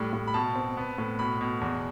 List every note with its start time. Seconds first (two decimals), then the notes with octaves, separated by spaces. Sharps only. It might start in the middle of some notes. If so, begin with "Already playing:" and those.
Already playing: A2 G3
0.13 A2
0.27 B5
0.34 B2 A5
0.56 C4
0.77 B3
0.98 A2
1.19 B2 B5
1.41 B2
1.61 E2